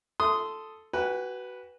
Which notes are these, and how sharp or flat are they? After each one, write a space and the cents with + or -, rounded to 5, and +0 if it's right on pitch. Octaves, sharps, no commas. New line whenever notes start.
A4 +0 C6 -15 D#6 +0
F#4 +25 B4 -5 G#5 -35